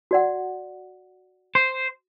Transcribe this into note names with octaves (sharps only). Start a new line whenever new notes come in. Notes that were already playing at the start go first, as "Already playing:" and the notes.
F#4 D5 F#5
C5